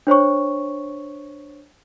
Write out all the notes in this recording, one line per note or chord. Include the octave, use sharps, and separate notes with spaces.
D4 C5 C#5 C#6